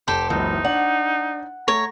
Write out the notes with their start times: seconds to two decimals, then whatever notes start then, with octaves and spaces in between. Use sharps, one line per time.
0.08 F1 G4 A4 C5
0.30 F#1 C#2 E3 F#3 D#4
0.64 D4 F#5
1.68 A3 C#5 A#5